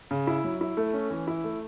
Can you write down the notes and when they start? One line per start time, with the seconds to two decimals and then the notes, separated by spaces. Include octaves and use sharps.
0.11 C#3
0.27 E4
0.44 F#3
0.61 E4
0.77 A3
0.93 C#4
1.10 E3
1.27 E4
1.44 A3